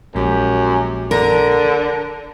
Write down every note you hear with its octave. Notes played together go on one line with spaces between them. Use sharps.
A#1 F#2 G#3 G4
D3 A#4